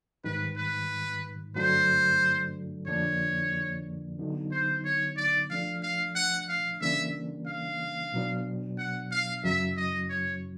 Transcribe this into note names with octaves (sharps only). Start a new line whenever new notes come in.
G#2 D#3 G3 B4
B4
G2 D3 F#3 A3 D4 C5
F2 D3 F3 A#3 D4 C#5
D3 F#3 B3 D#4
C5
C#5
D5
F3 A3 D4 F5
F5
F#5
F5
C#3 E3 G3 A#3 D4 E5
F5
B2 F#3 B3 D4
F#5
F5
F#2 C#3 F#3 E5
D#5
C#5